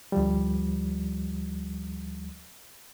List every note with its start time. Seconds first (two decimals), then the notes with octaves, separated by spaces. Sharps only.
0.12 D2 F3 G3